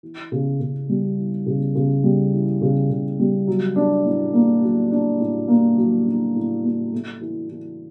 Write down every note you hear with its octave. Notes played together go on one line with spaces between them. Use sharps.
E3
C#3
C#3
G3
E3
C#3
C#3
G3
E3
C#3
C#3
G3
F#3
D4
A2
A#3
F#3
D4
A2
A#3
F#3
D4
A2
A#3
A3
E3
E3